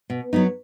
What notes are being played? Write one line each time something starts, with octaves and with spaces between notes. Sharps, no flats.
B2
F#3 B3 D#4